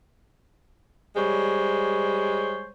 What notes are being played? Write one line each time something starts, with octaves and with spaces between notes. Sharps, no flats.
G3 G#3 C5 C#5